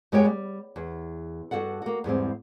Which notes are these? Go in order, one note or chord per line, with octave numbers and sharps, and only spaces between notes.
F#2 G#3 B3 G4 C#5 G5
G3
E2
G2 F3 F#4 A4 F#5
A#3 F#4
E2 G#2 G3 C4